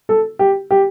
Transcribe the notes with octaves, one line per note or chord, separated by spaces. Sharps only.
A4
G4
G4